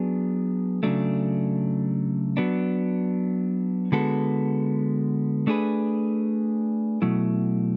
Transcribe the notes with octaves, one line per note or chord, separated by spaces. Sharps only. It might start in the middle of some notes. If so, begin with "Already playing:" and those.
Already playing: F#3 B3 D4 G#4
C#3 F#3 A3 D4
F#3 B3 D4
D3 G#3 B3 F#4 A4
A3 D4 G#4 B4
B2 F#3 A3 E4